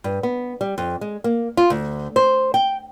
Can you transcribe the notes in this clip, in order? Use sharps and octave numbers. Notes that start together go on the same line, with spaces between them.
G2
B3
G3
F2
G#3
A#3
F4
D2
C5
G5